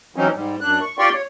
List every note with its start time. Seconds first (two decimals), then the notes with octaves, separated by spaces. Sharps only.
0.16 E3 F#3 C4 C#4 D#4
0.34 G#2 G3
0.61 F#2 D4 F#6
0.81 C#6
0.99 F4 G4 D5 G5 C6 C#6
1.14 C#5